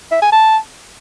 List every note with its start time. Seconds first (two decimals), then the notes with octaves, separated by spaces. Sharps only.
0.11 E5
0.22 G#5
0.32 A5